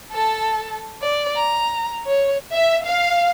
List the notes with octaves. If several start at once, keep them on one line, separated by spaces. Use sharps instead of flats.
A4 A5
D5
A#5
C#5
E5
F5